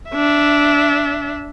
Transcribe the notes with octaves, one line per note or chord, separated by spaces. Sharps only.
D4 E5